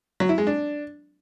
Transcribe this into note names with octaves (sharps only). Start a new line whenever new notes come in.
F#3
E4
G#3
D4